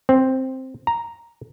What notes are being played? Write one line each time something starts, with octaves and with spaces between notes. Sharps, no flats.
C4
A#5